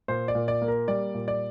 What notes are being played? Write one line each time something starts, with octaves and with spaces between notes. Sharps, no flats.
A#2 C5
D5
A#2
D5
A#3
A#4
G3 D5
A#2
D5